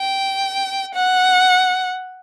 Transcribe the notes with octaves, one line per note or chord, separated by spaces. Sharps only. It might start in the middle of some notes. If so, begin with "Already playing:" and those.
Already playing: G5
F#5